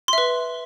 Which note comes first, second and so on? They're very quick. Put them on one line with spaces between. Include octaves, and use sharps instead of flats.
C6 E5 B4